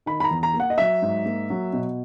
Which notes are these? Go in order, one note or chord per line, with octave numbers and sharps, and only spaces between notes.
D#3 B5
B5
A#5
E2
A#5
A#3
F#5
D#5
F#3 E5
G#2
A#3
F#3
B2